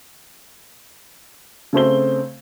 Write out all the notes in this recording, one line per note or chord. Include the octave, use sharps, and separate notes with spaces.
C#3 A3 C4 G7